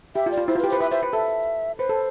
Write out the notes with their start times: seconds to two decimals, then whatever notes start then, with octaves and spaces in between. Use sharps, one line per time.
0.15 G4 E5
0.26 F4
0.31 D5
0.38 F4
0.48 E4 C5
0.55 F4 B4
0.64 G4
0.70 B4 C5
0.80 B4 E5
0.91 C5 E5
1.03 B4
1.13 A4 E5
1.78 B4 C5
1.89 A4